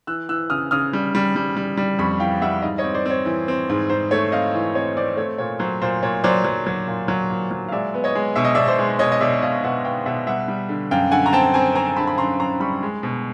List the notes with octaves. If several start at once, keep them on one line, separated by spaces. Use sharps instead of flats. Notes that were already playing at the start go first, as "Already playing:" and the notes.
E3 E6 F#6
E3 E6 F#6
C#3 D#6 F6
C#3 D#6 F6
G3
G3
G3
G3
G3
F2 B5 C#6
E3 F5 G5
G3 E5 F#5
G#2 D#5 F5
C#5 D#5
C4
C5 D5
C4 C#5
E3
C4
G#2
G#2 C5
A3 C#5
C4 D#5 F5
E3
C4 C#5 D#5
C4 C5 D5
A3 C#5
A#2 C#5
F#3 C5
A#2 C5
A#2 C#5
F#3 C5 D5
F#3
F#3
A#2
F#3
A#2
F#3
F5
G#3 D5 E5
B3
C#5 D#5
G#3
B2 E5
D#5
D5 E5
B2
C5 D5
G#3
B2 C#5 D#5
D#5
B2 D5 E5
B2 D#5 F5
B2 E5 F#5
B3 F5 G5
B2 E5 F#5
G3 E5 F#5
G3
D3
F#2 F5 G5
D3 F#5 G#5
A#5
C4 G5 A5
C4 G#5 A#5
C4 G#5 A#5
D3 A5 B5
B5
F#2 A#5 C6
F#2 A#5 C6
G3 B5 C#6
G#3
B2